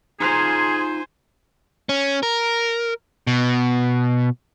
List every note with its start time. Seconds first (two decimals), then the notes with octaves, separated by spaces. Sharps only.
0.20 D#4 F4 G#4 C5 G#5 A#5
1.89 C#4
2.23 A#4
3.27 B2